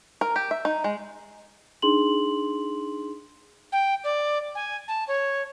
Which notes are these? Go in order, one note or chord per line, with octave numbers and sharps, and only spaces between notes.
A#4
G4
E5
D#4
G#3
D4 D#4 G#4 C6 F#7
G5
D5
G#5
A5
C#5